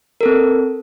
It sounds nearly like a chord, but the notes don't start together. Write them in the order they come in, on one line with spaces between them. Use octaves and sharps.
A#4 A4 C4